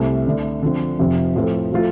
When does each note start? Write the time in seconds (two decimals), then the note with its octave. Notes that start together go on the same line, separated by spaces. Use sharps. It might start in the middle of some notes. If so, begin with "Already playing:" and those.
Already playing: C2 C3 A3
0.26 D3 A3 D4
0.62 D3 F3 C4
0.98 F1 F2 C3 F3 C4
1.36 A2 F3 C4 A4 C5
1.72 F3 A3 F4